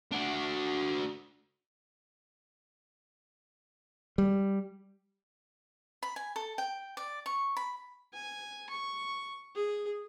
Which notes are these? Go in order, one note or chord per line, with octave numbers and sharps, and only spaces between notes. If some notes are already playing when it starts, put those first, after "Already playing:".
D4 F#4
G3
B5
G#5
A4
G5
D5
C#6
B5
G#5
C#6
G#4